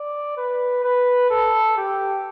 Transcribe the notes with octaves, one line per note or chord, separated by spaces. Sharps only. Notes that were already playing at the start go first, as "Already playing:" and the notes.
Already playing: D5
B4
B4
A4
G4